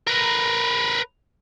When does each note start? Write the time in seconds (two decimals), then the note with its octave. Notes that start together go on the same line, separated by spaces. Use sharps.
0.07 A#4 B4